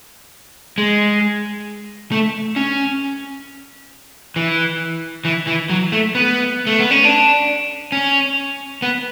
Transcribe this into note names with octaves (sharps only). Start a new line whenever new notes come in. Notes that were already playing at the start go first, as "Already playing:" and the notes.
G#3
A3
C#4
E3
E3
E3
F#3
A3
B3
A3
B3
C#4
D4
C#4
B3